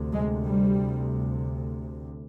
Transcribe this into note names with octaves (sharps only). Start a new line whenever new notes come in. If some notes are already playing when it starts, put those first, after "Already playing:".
Already playing: D2 C3
G#3
G3